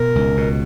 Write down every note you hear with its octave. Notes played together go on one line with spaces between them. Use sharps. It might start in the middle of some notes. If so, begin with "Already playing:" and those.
Already playing: B2 A#4
C#2
B2